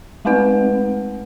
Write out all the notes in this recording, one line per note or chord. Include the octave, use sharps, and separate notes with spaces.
G#3 A3 C4 D#4 B4 F#5